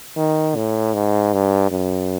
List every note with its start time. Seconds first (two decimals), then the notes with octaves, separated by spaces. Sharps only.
0.17 D#3
0.56 A2
0.94 G#2
1.33 G2
1.71 F#2